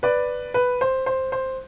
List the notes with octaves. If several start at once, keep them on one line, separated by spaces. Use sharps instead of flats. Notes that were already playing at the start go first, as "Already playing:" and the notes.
B4 D5
B4
C5
C5
C5